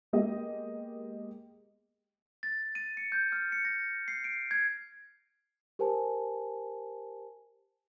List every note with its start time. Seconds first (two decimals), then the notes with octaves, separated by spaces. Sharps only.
0.13 G#3 A#3 B3 G4 D#5
2.43 A6
2.75 D#7
2.97 C#7
3.12 G6
3.32 F6
3.52 C#7
3.65 A#6
4.08 C7
4.24 D7
4.51 G#6
5.79 G4 A#4 C5 G#5 A5